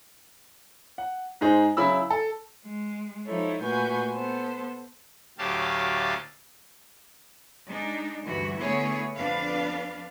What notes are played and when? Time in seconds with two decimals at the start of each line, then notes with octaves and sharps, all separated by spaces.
0.98 F#5
1.41 G#2 G#3 D#4 G#4 C5
1.77 C#3 F#3 E4 B5 E6
2.10 A4
2.66 G#3
3.25 F3 D#4 E4 A4 C#5
3.62 A#2 A3 F#4 B4 G#5 G6
4.13 B3 A4 C5
5.38 D2 A2 F#3 G4 F5 A5
7.70 G#3 D4 D#4
8.26 D2 G2 E3 F#4
8.60 D3 A3 B3 E4 G#4 C#5
9.18 F2 B3 D4 B4 F5